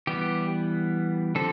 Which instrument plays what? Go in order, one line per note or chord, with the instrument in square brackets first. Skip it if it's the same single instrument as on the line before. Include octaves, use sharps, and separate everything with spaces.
[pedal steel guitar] E3 G3 B3 G4
D3 F3 C4 A4